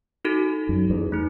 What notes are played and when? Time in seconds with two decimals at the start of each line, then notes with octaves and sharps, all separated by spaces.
0.25 D#4 F#4 A4
0.69 F#2
0.90 E2
1.12 A3 D#4